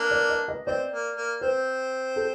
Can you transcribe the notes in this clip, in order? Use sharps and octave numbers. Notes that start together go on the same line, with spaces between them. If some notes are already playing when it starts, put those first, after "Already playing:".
Already playing: A#3 D4
D5
D#5
D#5
C4 D5
A#3
A#3
C4 C5
A4